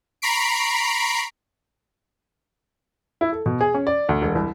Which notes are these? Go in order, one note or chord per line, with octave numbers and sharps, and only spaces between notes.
A#5 B5 C#6 B6 C7 D7
E4
A4
B2
G#4
C#4
D5
D2
E1
C2